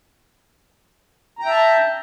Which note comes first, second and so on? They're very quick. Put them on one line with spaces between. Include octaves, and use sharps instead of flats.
A#5 G5 E5 A5